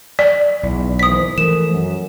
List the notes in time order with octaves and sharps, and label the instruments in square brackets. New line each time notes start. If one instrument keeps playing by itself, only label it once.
[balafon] D5
[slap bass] B1 [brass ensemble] E2
[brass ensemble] G#1 E3 C5 [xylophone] D#6 B6
[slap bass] E3 F3 [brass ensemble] A3 A4 A#4 [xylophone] E7
[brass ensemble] F#2